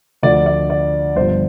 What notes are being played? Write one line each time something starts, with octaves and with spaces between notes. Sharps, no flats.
D2 D3 F3 D5
D5
D5
G1 G2 F3 C5